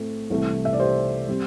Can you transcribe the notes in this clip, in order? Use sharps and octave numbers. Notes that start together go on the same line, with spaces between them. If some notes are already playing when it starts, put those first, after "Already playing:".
Already playing: A2 A3 C4
C2 C3 E3 A3
E5
D5
G4 C5
G3 C4